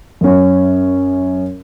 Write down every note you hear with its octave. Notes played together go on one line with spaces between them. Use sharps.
F#2 C#4